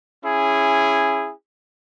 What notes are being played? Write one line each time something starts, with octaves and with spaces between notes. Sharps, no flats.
C#4 E4 G#4